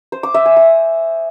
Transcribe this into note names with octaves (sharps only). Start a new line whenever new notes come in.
C5
D6
E5
G#5
D#6